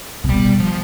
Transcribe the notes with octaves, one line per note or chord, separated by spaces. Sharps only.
C3
B2 G3
F3